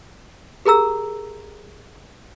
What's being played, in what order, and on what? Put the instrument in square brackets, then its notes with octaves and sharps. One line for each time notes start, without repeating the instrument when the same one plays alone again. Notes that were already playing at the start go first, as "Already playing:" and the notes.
[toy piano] G4 G#4 A#4 A#5 E6